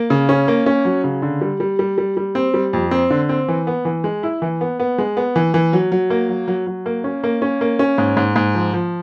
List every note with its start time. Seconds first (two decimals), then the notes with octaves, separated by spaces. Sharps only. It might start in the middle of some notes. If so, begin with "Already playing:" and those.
Already playing: A#3
0.10 C#3
0.29 C#4
0.48 A#3
0.66 C#4
0.85 F#3
1.04 C#3
1.22 D3
1.41 G3
1.60 G3
1.79 G3
1.98 G3
2.17 G3
2.35 C4
2.54 G3
2.73 F2
2.91 C4
3.10 D3
3.29 C4
3.48 E3
3.67 B3
3.85 E3
4.04 G#3
4.23 E4
4.42 E3
4.61 B3
4.80 B3
4.98 G#3
5.17 B3
5.36 E3
5.54 E3
5.73 F#3
5.92 F#3
6.10 A#3
6.29 F#3
6.48 F#3
6.67 F#3
6.86 A#3
7.04 C#4
7.24 A#3
7.42 C#4
7.61 A#3
7.79 C#4
7.98 G#2
8.17 G#2
8.36 G#2
8.55 F3
8.73 F3